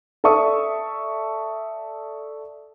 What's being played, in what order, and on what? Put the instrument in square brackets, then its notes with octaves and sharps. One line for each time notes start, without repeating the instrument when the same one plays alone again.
[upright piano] A4 D5 E5 C#6 D#6